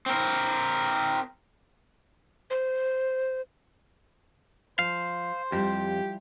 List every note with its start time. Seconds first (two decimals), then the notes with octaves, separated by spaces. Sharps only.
0.06 C4 A#4
2.50 C5
4.79 F3 C5 F5
5.52 F2 F3 G3 E4 G4